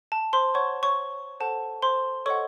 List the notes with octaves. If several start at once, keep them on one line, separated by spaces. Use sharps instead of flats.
A5
C5 C6
C5 C#5 F#5 C#6
C#5 C#6
A4 C5 F#5 A5
C5 C6
A4 C#5 D#5 F#5 C#6